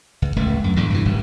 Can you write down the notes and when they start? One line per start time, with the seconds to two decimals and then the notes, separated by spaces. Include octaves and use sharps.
0.22 C#2
0.36 D1 C#2 A3
0.64 F#2
0.76 E2 A2 D3
0.90 G2 C3 E3
1.05 D1 G#1 F#2 B2